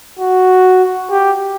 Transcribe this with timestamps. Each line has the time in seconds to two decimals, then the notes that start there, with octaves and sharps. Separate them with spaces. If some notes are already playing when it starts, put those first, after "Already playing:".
0.19 F#4
1.11 G4